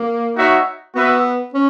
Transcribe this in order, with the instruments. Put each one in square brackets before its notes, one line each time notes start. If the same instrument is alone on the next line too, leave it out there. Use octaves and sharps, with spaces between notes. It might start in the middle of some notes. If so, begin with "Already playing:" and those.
Already playing: [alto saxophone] A#3
[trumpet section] D#4 F#4 C#5 E5
[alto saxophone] B3 [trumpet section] F#4 B4 E5
[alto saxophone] C#4